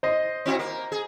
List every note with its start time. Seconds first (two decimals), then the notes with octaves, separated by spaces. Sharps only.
0.03 C5 D#5
0.46 C4 E4 F#4
0.59 A#3
0.92 G#4